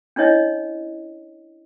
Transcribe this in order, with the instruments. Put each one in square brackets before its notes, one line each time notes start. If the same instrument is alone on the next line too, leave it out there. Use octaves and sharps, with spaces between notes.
[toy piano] C#4 D4 E4 C#5 D#5